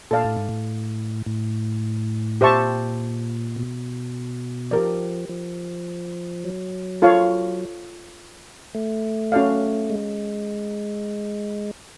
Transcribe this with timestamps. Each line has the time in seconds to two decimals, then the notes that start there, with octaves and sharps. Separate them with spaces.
0.11 A#2 A4 D5 F5 A5
0.24 A2
0.36 G#2
0.49 A2
1.26 A2
2.41 A#2 G4 C5 E5 A5 C#6
3.56 B2
4.71 F3 G4 A#4 D5
5.29 F3
6.44 F#3
7.02 F4 A4 C#5 F5
8.75 A3
9.32 C#4 F#4 A4 D5 F5
9.90 G#3